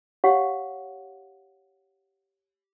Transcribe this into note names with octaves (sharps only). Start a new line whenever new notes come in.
G4 C#5 F5 F#5